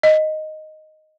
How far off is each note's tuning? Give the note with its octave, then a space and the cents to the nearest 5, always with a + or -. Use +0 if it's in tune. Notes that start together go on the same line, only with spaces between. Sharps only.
D#5 +0